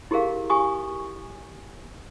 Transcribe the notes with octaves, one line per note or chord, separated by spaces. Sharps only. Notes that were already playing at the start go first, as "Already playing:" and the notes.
E4 G4 G#4 A#4 F5
G4 G#5 C#6 D#6